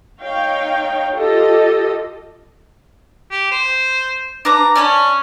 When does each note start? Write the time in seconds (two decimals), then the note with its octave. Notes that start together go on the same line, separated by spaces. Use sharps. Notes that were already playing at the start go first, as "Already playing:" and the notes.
0.19 D#4 C#5 F5 G5
1.16 F4 G4 A4 D#5
3.31 G4
3.51 C5
4.45 D4 B4 A#5 D6
4.75 C#4 D5 A5 B5